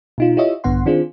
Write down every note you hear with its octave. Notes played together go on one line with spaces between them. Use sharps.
B2 D#4 F4
E4 F4 G4 C#5 D#5 E5
A#1 G2 D3 B3 F#5 C6
D#3 C4 D4 F4 G#4 C5